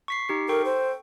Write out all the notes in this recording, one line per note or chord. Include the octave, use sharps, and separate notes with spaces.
C#6 B6 C7
D#4 G4 C7
A4 A#4 G5 C#6
C5